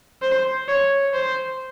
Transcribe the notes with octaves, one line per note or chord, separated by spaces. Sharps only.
C5
C#5
C5